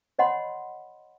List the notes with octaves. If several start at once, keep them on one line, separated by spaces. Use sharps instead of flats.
C#5 D#5 F#5 B5 C6